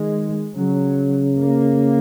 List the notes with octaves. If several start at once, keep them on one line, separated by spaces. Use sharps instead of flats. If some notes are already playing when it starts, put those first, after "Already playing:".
Already playing: D#3 G#3
C#3 F#3
A#3